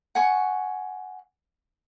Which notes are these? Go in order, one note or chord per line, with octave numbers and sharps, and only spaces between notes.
F#5 G#5 C#6